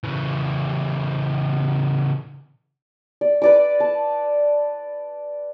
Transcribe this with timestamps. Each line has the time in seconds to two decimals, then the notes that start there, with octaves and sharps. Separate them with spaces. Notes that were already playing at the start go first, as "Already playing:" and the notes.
0.04 C#3 E3
3.21 D5
3.42 B4 D5 D6
3.80 A5